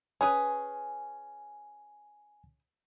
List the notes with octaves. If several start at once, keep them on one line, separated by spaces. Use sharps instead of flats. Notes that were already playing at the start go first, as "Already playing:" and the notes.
C#4 G#4 B4 G#5